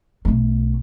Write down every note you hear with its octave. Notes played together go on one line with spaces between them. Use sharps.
B1 A3